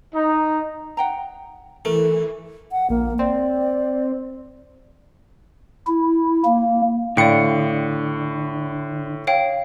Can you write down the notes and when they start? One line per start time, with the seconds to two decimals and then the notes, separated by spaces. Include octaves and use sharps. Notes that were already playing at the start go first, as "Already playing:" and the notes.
0.14 D#4
0.97 F#5 G5 A#5
1.85 E3 A3 A#4
2.72 F#5
2.90 A#1 A#3
3.19 C4 D5
5.87 E4
6.45 A#3
7.17 A2 D3 D5 F5 G5 C#7
9.27 C#5 F5 G5